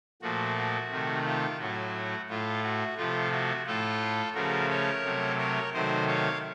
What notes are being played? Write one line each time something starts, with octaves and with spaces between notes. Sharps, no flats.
A#2 F3 A3 F#4
F#4
C3 D#3 A3
F4
A2 F#3 A3 F#4
A2 A3 F4
F#4
C3 F3 A3 F4
F#4
A2 A3 F4 A4
C#3 F3 A3 F#4 A#4
A#4 C#5
C3 F#3 A3
A#4 C#5
C3 D#3 F#3 A3 C5 D#5
C#5 F5